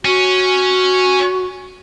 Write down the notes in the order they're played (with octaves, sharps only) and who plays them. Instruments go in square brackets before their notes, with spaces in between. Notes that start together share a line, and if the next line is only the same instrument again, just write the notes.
[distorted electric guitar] C#4 [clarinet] F#4